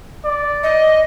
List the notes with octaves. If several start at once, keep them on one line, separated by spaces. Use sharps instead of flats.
D5
D#5